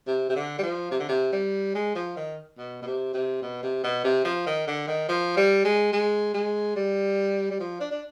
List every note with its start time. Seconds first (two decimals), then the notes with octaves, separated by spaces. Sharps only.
0.07 C3
0.29 C3
0.36 D3
0.58 G3
0.63 F3
0.91 C3
0.99 D3
1.09 C3
1.32 G3
1.74 G#3
1.95 F3
2.16 D#3
2.58 B2
2.82 B2
2.86 C3
3.14 C3
3.42 B2
3.63 C3
3.84 B2
4.04 C3
4.25 F3
4.46 D#3
4.67 D3
4.88 D#3
5.09 F3
5.37 G3
5.65 G#3
5.92 G#3
6.34 G#3
6.76 G3
7.50 G3
7.60 F3
7.80 D4
7.91 D4